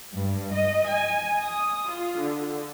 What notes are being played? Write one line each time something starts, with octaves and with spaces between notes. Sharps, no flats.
G2
D#5
G#5
D#6
F4
D3